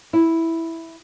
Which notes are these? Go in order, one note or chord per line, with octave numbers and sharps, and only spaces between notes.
E4